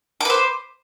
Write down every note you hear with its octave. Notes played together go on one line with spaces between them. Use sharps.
B4 C5 D6